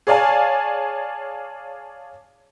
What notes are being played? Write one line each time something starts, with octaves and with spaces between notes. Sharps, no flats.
G#4 C#5 D5 F5 G#5 A5